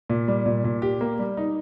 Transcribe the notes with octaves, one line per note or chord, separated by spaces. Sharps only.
A#2
G3
A#2
A#2
G4
A#3
G3
D#4